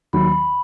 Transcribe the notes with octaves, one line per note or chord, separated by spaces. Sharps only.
D#2 D#3 F#3 B5